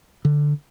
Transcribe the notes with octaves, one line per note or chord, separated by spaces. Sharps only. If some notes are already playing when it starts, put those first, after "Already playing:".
D3